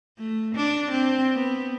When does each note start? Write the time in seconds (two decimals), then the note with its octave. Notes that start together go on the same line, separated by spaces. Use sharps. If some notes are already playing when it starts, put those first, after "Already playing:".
0.18 A3
0.55 D4
0.91 C4
1.35 B3